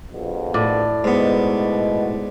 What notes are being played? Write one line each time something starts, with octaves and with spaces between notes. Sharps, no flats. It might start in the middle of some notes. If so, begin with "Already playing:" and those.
A#1 F2 B2
A2 D5
G#2 B2 B3